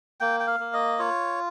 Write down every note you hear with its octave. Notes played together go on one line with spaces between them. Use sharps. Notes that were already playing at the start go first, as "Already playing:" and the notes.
A#3 G5
G5
F5
A#3
D#5
F4 C#5